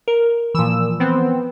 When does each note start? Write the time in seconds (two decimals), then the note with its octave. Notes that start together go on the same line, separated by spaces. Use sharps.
0.08 A#4
0.55 A#2 E3 F3 E6
1.00 B3 C4